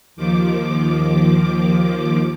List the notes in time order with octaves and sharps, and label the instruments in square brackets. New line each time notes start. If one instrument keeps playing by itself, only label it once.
[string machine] D#2 D#3 F3 D6